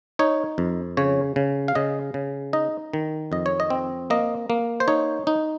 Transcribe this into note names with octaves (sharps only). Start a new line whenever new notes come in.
D#4 C#5
F2
C#3 C#5
C#3
F5
C#3 D#5
C#3
D#4 D#5
D#3
F2 D#5
C#5
D#5
C4
A#3 D#5
A#3
C5
D#4 C#5
D#4